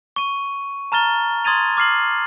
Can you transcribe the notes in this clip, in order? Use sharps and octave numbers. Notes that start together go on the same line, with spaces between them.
C#6 D#7
A5 A#5 F6 A6 G7
C6 D#6 G#6 A6 D#7 F7
D6 F6 C7 F#7